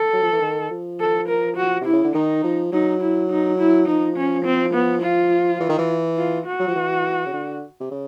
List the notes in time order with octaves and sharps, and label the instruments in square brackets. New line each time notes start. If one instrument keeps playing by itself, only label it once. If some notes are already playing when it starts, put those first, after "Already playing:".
Already playing: [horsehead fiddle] A4
[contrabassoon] F#3
F3
E3
D#3
F3
[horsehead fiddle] A4
A#4
F#4
[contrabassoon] C3 [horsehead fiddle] E4
[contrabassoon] C#3
D3
[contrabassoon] D#3 [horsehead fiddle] D#4
[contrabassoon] F3
[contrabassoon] F#3 [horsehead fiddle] D#4
[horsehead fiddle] E4
D#4
E4
[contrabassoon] F3 [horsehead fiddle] D#4
[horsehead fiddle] C#4
C4
B3
F4
[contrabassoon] E3
D#3
E3
[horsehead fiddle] F4
F#4
[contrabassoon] F#3
F3
E3
C#3
D3
C3
C#3